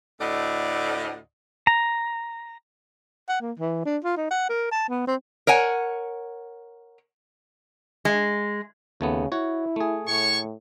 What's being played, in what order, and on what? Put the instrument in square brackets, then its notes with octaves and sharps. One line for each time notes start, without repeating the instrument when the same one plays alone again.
[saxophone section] D2 A2 A3 D5 D#5 F#5
[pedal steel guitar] A#5
[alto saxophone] F#5
A#3
E3
D4
F4
D#4
F#5
A#4
A5
B3
C4
[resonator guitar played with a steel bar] A#4 C#5 F#5 G#5
G#3
[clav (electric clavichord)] D#2 A3 B3 [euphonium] C#3
[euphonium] E4 [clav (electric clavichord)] F#4 C#5
[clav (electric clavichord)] A3 G#4
[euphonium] A2 [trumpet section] C#5 C#6